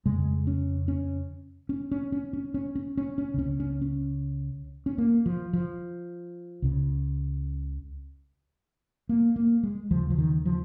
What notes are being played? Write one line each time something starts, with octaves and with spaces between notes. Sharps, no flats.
F2 C#3 G#3
C#4
C#4
C#4
C#4
C#4
C#4
C#4
C#4
C#4
C#4
C#2 C#3 C#4
C#4
C#4
C#4
A#3
F3
F3
C#2 C#3
A#3
A#3
G#3
D#2 C#3 F3
F3
D#3
F3